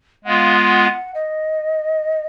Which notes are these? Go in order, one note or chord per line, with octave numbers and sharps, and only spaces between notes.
G#3 B3 F4 F5 F#5
F#5
F#5
D#5